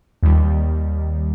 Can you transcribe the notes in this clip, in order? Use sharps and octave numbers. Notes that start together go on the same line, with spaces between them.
D#2 D#3 G3